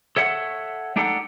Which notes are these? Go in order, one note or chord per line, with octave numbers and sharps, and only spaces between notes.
A4 C#5 E5 F#5
A3 D4 D#4 G4 A4 F#5